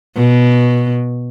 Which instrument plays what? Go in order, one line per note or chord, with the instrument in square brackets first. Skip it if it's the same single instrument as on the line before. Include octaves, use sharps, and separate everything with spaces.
[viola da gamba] B2